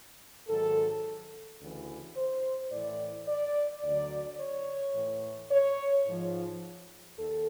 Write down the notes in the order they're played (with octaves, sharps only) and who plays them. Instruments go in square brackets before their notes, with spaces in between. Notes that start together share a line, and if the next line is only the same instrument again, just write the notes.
[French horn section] G#2 D#3 F#3 A4
D2 C#3 E3
C5
A2 E3 D5
D5
D2 D3 F#3 D5
C#5
A2 E3
C#5
G#2 F3
D#2 A4